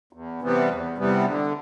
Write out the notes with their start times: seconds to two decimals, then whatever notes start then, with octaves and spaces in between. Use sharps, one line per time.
0.13 E2
0.42 C3 E3 G3 B3
0.70 E2
0.98 C3 E3 G3 B3
1.25 D3